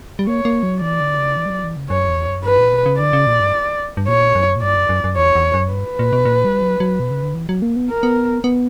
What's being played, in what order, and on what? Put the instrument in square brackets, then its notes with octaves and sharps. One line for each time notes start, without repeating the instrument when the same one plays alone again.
[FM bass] G3
[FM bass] A#3 [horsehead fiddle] C#5
[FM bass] A#3
F#3
[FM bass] E3 [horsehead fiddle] D5
[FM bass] D3
C#3
E3
G3
F#3
E3
C#3
[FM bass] F#2 [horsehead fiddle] C#5
[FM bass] E2
F#2
[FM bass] G2 [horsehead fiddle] B4
[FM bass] A#2
B2
C#3
[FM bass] D3 [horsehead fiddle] D5
[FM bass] C#3
A#2
G2
G2
[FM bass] A#2 [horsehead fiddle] C#5
[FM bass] F#2
A#2
[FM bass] G2 [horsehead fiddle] D5
[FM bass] F#2
F#2
F#2
[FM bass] E2 [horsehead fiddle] C#5
[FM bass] E2
F#2
[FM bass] G2 [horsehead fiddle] B4
[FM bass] A#2
B2
A#2
G3
F#3
F#3
B2
C#3
D3
E3
F#3
A#3
B3
[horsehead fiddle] A#4
[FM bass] B3
B3